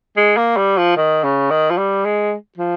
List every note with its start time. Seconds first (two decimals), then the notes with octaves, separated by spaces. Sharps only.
0.16 G#3
0.37 A#3
0.57 G3
0.77 F3
0.97 D#3
1.23 C#3
1.50 D#3
1.70 F3
1.77 G3
2.05 G#3
2.58 F3